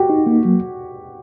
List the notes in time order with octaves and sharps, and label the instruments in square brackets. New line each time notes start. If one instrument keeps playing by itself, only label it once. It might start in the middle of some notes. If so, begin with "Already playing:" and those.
Already playing: [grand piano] F#4 G4
[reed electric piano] D#4
A#3
F#3